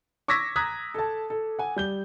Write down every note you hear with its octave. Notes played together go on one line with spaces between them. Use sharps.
C#6 D6 E6 G#6 A#6 B6
A#5 D#6 F#6 G#6 B6
A4 A5
A4
F#5 G#5
G3 G6 G7